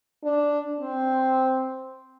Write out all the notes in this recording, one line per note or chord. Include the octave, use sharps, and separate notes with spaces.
D4
C4